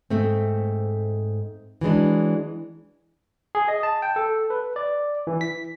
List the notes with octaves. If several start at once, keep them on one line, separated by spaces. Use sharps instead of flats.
G#2 A3 C4
E3 F#3 G#3 D4
G#4
D#5
A5
G5
A4
B4
D5
E3
B6